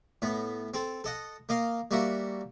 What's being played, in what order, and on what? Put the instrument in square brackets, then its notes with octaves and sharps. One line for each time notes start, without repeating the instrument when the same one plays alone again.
[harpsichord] A2 B3
C4 A4
A4 D#5 F#5
A#3 D#5 F5
G3 A#3 F#4 E5 F#5